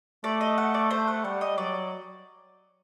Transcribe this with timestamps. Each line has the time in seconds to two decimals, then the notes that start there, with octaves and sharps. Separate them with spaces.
0.24 A3 D5
0.41 D#5
0.58 F#5
0.74 D5
0.91 A3 C5
1.08 A3 F#5
1.24 G3 F#5
1.41 D#5
1.58 F#3 D5